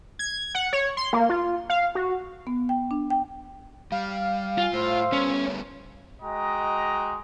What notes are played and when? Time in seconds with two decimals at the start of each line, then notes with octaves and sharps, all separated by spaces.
0.19 G#6
0.55 F#5
0.73 C#5
0.97 C6
1.13 A#3
1.29 F4
1.70 F5
1.95 F#4
2.47 B3
2.69 G5
2.91 D4
3.10 G5
3.92 G3 F5
4.58 F4 G#5
4.73 A2 C5 C6 E6
5.12 G3 A3 B3 C#4
6.21 G#3 F#4 D#5 G5 A#5